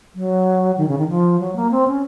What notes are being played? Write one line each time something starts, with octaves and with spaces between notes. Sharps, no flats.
F#3
D#3
C#3
D#3
F3
F#3
A#3
C4
C#4